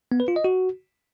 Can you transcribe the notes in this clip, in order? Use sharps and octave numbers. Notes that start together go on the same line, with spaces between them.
B3
B4
F4
D#5
F#4